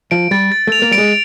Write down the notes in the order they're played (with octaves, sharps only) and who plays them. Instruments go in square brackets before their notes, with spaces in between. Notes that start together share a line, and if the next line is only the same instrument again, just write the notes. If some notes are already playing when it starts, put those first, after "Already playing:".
[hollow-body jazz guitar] F3 [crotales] D7
[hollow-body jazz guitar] G3 [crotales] A6
[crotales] A6
[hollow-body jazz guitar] A3 [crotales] F7
[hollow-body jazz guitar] A#3
[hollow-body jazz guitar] G3 [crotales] D7
[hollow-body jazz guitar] G#3